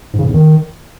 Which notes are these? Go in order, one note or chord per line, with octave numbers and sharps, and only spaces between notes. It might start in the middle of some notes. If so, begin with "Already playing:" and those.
G#2
C#3
G#2
E2
D#3